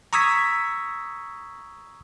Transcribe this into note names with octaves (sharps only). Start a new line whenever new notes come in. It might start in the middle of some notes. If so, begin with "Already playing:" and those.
A#5 C#6 D#6 E6 G#6 B6